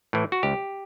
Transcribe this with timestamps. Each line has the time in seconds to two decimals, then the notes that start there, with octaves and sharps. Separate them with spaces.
0.13 A2 E3
0.32 F#4
0.43 C#2 G4